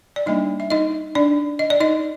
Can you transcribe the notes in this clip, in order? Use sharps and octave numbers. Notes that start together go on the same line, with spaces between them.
D5
G3 A#3 D4 D#4 D#5
E5
D#4 D#5
D4 D5
D#5
D5
D#4 D#5